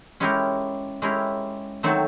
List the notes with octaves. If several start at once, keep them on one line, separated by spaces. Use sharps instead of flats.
G#3 C#4 E4 G4 A#4
G#3 C#4 E4 G4 A#4
D#3 F#3 A3 C4